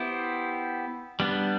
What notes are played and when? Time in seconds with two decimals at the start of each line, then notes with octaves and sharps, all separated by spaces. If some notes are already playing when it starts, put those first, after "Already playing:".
Already playing: B3 E4 G4 C5
1.20 G3 B3 D4